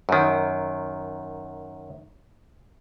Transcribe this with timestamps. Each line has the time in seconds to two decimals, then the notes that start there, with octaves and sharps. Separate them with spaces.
0.09 F#2 D#3